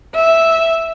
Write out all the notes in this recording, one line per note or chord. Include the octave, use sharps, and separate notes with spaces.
E5